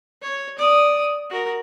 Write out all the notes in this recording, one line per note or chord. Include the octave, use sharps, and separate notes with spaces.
C#5
D5 D#6
F#4 A#4